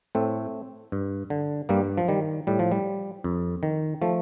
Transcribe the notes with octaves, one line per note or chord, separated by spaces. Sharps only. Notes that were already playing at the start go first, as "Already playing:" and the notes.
A2 A3 C4
G2
D3
G2 G3 A#3
F3
D#3 G3
A2 G3
F3
G3
F2
D#3
F3 A3